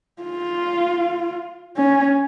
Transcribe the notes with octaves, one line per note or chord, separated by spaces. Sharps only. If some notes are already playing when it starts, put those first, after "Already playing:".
F4
C#4